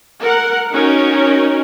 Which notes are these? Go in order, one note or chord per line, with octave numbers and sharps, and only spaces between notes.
A#4 F#5
C#4 D#4 F#4 A#4 C#5